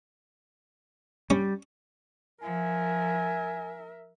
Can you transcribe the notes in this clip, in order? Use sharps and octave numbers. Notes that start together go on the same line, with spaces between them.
G3 C#4
F3 A#4 E5 G#5